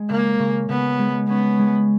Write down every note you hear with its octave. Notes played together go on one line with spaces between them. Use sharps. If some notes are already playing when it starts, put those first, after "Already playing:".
Already playing: G#3
C#3 A#3
C#3
C#3 B3
G#3
B3 C#4
G#3